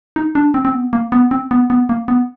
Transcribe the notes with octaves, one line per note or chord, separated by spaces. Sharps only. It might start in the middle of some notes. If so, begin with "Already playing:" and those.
D#4
D4
C4
C4
B3
A#3
B3
C4
B3
B3
A#3
B3